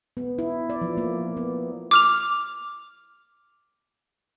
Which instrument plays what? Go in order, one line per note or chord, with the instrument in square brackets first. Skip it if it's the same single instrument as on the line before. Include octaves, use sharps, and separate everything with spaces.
[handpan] B3
E4
D5
F3
A#3
B3
[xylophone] D6 F6 F7